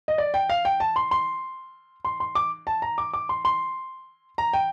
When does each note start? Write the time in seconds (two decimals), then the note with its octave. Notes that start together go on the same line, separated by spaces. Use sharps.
0.08 D#5
0.18 D5
0.34 G5
0.50 F5
0.65 G5
0.80 A5
0.96 C6
1.11 C6
2.05 C6
2.20 C6
2.35 D6
2.67 A5
2.82 A#5
2.98 D6
3.14 D6
3.29 C6
3.45 C6
4.38 A#5
4.53 G5